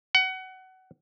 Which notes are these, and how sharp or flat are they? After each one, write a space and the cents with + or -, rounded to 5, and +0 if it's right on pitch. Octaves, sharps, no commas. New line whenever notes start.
F#5 +25